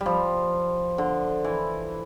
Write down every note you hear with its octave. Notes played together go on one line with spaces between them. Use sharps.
G3
F3
D3
E3